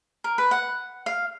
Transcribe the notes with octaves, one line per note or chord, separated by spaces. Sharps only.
A#4
B4
F#5
F5